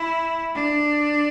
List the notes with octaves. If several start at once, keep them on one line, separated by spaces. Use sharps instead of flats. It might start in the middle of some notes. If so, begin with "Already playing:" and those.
Already playing: E4
D4